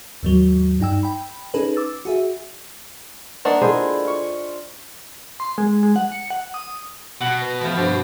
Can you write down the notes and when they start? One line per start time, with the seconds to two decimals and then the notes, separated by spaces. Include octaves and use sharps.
0.23 D#2 G#2 F#3
0.80 G2 D#4 G5 E6
1.03 G5 B5
1.54 C#4 D#4 G#4 A4 B4
1.76 D6 E6 A6
2.05 F#4 G#4 E5
3.45 A#3 D4 D#5 F#5
3.61 D3 E4 F4 G#4 C5 D#5
4.05 F4 C#6
5.40 C6
5.58 G#3
5.83 G#3
5.96 F#5
6.12 C#7
6.30 F#5
6.54 D#6
7.21 B2 F#5
7.41 B4
7.61 F3 A3 B3
7.77 G2 A4 B4 C5